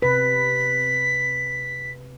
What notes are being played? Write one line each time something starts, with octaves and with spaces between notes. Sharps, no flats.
C3 B4 B6